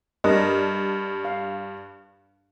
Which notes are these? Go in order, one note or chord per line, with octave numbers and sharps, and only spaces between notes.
G2 D4 A#4 D#5
F5